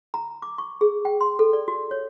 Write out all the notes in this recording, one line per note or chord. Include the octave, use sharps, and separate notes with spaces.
A#5
D6
C#6
G#4
G5
C6
A4
D5
F#4
C#5